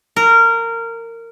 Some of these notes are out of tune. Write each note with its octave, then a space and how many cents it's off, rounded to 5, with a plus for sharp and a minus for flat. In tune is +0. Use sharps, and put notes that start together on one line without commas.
A#4 -20